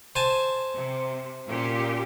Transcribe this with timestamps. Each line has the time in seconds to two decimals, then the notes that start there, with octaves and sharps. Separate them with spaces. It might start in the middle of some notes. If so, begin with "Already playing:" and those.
0.16 C5 G#5 A5
0.75 C3
1.47 A#2 C#4 G4